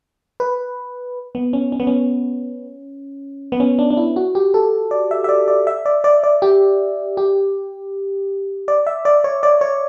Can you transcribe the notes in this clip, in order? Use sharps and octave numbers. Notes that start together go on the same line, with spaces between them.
B4
B3
C#4
C#4
B3
C#4
B3
C#4
D4
D4
E4
F#4
G4
A4
D5
E5
E5
D5
D5
E5
D5
D5
D5
G4
G4
D5
E5
D5
C#5
D5
C#5